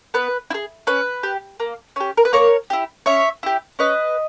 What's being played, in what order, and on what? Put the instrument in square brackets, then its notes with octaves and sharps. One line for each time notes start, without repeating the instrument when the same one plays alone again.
[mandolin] B3 B4
E4
G#4
C#4 B4
G4
A#3
C#4 G4
A#4
B4
A#3 A#4 C#5
E4 G4
C#4 C#5 E5
E4 G4
C#4 B4 D#5